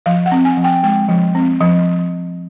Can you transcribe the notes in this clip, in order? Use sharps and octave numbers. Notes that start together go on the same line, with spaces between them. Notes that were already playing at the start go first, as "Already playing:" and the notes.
F3 F5
F#5
C4
G#5
F3
G5
G#3 G5
F3
C4
F3